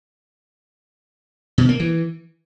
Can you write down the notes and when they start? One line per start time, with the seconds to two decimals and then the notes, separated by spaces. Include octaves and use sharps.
1.58 B2
1.69 A#3
1.80 E3